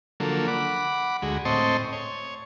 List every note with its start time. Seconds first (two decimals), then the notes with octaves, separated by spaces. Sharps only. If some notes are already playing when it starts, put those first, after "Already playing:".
0.20 D3 F3 F#3 A#3 A4
0.48 F#5 B5 D6
1.22 D2 G#3 F#4
1.45 A2 C4 D#5 A5 C6 C#6
1.93 C#5